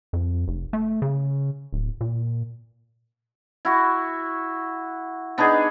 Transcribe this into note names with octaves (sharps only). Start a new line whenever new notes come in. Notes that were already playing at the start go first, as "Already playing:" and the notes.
F2
F1
A3
C#3
D1
A#2
E4 F#4
B3 D4 D#4 G#4